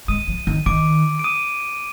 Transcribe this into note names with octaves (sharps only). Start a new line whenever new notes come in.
G#3 D#6 D#7
F3
D#3
D#3 D6 D7
D7
D#6 D#7